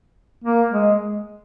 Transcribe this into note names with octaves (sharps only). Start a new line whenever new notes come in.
A#3
G#3